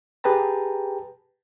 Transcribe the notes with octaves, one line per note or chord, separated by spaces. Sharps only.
G4 G#4 B4 G5 A5 A#5